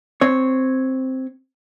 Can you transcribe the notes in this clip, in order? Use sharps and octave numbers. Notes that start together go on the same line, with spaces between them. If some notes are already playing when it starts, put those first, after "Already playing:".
C4 C#5